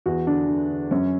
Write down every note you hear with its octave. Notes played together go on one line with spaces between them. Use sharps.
E2 F#4
D3 D4
D3
D3
F#2 C#4